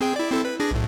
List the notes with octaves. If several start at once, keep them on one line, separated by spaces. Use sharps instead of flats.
C4 G#4 G5
E4 D5
C4 E4 A4
B4
D4 G#4 A#6
B1 A2